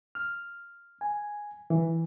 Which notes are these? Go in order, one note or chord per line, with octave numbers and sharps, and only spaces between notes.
F6
G#5
E3